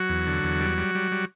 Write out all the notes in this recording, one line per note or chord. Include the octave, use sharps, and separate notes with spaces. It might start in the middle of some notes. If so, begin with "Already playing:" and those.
Already playing: F#3 F#4
E2
D3
E2
G3
G3
G3
G3